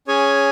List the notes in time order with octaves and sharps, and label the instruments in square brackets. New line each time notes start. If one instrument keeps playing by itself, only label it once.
[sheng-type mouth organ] C#4 G#4 C#5 G#5